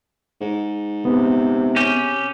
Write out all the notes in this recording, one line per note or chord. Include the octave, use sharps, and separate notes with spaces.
G#2
C3 B3
C#4 G4